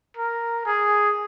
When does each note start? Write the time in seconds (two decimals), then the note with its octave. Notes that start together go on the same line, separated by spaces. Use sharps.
0.17 A#4
0.66 G#4